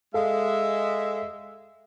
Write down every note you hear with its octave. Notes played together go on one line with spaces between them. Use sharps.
G#3 A4 E5 F5